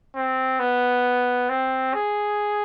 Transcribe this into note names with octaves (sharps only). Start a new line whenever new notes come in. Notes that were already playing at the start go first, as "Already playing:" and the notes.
C4
B3
C4
G#4